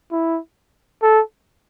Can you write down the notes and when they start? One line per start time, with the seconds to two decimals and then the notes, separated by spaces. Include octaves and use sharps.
0.12 E4
1.03 A4